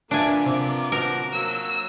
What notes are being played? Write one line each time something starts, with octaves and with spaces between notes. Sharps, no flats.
B3 D4 F4 A#4 E5 G#5
C3 D6
F3 F#4 A#4
F#3 A#3 E6